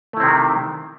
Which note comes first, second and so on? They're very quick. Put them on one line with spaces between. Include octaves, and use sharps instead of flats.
A3 E4 C4 C3 D#3